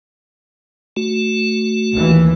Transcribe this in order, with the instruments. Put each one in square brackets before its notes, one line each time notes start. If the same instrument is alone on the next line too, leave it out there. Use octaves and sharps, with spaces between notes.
[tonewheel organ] A3 F#4
[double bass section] D#2 E3